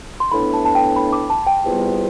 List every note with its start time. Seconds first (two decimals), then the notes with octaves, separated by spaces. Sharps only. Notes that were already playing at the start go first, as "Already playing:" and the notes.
0.20 C6
0.31 A2 E3 B3 D4 B5
0.53 A5
0.65 A5
0.75 G5
0.96 B5
1.13 D6
1.30 A5
1.47 G5
1.62 E2 C3 G3 B3 F4